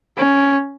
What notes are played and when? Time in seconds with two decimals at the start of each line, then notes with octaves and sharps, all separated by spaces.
0.17 C#4